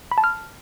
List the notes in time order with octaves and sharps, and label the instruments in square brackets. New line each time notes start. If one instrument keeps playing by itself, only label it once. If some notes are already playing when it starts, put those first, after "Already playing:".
[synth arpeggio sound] B5
A5
F6